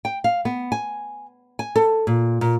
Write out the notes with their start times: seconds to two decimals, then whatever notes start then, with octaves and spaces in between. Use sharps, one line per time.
0.05 G5
0.24 F5
0.45 B3
0.72 G#5
1.59 G#5
1.76 A4
2.07 A#2
2.41 A#2